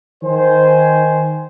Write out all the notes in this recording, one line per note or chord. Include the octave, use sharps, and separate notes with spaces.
D#3 C5 G#5